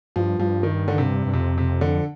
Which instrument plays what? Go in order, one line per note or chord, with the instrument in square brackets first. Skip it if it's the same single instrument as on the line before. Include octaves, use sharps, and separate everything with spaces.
[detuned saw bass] G2 [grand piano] F3
[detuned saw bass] G2 [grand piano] F3
[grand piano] D#3
D3
C3
[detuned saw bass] G2
[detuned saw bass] F2 [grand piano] C3
[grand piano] C3
D3